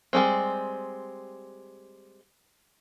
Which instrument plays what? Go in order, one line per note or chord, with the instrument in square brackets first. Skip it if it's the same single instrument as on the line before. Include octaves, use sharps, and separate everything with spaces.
[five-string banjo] G3 G#3 C4